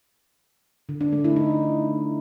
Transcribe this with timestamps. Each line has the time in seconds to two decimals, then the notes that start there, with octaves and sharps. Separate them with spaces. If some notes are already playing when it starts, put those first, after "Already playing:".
0.89 D3
1.01 D4
1.13 A3
1.24 E4
1.36 D#4